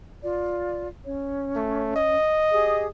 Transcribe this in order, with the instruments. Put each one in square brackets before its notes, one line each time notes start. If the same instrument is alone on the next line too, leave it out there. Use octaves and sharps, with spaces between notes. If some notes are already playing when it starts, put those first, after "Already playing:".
[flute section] F4 D5
C#4 C#5
[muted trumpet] A3
D#5
[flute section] G4 G#4 D#6